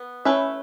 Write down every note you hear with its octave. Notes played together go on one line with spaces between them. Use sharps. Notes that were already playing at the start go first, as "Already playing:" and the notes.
Already playing: B3
A3 C#4 E4 B4 E5